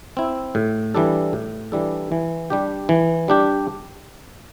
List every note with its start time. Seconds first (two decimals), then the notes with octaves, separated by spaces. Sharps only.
0.17 C4 E4
0.55 A2
0.95 E3 G3 D4 A4
1.33 A2
1.72 E3 G3 D4 A4
2.12 E3
2.50 G3 D4 G4
2.89 E3
3.28 G3 D4 G4